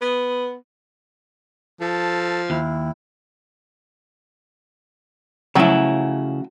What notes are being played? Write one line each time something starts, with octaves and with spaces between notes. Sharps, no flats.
B3
F3 A4 A5
D#2 E4
C#3 F3 F#3 A3 E4